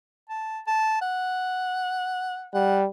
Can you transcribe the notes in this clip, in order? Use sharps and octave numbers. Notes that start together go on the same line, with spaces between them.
A5
A5
F#5
G3 F#5